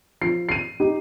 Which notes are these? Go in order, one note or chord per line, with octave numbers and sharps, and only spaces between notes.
F3 C7
C7 D#7
D#4 G4